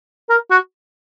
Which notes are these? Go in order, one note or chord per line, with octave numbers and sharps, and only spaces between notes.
A#4
F#4